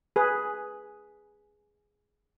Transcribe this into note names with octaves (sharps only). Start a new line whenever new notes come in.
G#4 B4